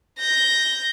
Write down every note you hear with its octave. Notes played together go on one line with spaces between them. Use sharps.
G6 A#6